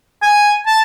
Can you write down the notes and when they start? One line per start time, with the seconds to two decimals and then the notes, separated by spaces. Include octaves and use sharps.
0.23 G#5
0.67 A5